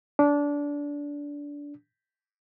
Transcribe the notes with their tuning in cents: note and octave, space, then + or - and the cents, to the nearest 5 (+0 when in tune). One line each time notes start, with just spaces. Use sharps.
D4 -20